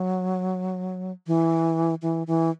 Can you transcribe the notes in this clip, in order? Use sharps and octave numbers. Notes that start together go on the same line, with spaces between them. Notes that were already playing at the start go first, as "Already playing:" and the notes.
Already playing: F#3
E3
E3
E3